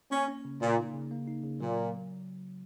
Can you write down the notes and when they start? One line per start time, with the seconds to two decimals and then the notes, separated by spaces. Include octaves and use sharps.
0.11 A#3 C#4
0.28 C#4
0.45 C#3
0.61 A#2 A#3
0.78 D#4
0.94 C#3
1.11 A#3
1.28 D#4
1.44 C#3
1.60 A#2 F#3